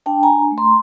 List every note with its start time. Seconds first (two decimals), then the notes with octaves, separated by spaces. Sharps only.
0.06 D4 G5 A5
0.23 D4 G#5 A#5
0.52 A3
0.58 A#5 C6